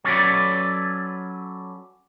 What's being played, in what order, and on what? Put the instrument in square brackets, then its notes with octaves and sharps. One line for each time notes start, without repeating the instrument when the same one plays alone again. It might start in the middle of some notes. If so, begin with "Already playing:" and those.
[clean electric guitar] F#3 C#4 A4 B4 D5